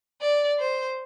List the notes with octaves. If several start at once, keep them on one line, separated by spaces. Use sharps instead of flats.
D5
C5